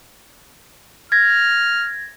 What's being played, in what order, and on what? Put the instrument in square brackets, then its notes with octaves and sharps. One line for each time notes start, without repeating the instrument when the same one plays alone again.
[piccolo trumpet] F6 [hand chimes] G#6 A#6